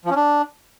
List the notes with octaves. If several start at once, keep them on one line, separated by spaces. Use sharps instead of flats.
F3
C#4
D4